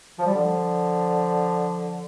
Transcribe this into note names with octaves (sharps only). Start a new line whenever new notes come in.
F3
G3
D3 F3